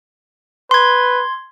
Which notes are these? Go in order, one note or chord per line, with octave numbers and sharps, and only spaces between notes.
B4 C6 G#6